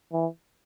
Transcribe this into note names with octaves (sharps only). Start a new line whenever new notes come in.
E3